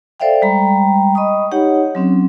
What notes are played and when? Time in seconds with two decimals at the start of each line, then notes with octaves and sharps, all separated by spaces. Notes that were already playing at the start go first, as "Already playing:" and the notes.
0.20 A4 C5 D5 E5 F5 G5
0.42 G3 G#3 G5 A#5 B5
1.15 D#5 B5 C#6 D#6
1.52 D#4 G4 C#5 F#5
1.95 F#3 C4 C#4